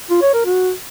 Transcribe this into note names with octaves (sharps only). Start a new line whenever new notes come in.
F4
C#5
A#4
F#4